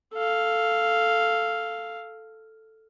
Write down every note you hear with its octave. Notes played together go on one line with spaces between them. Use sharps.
A4 F5